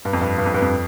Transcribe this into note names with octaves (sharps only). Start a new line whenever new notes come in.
G2
F2
G2
G2
F2
G2
F2